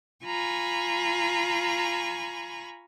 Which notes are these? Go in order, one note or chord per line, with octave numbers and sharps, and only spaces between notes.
F4 G#5 A#5 B5 C#6